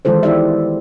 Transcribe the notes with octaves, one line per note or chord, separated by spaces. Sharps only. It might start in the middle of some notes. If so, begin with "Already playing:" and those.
D#3 E3 G#3 F4 A4 C5
B3 E4 G4 D5 E5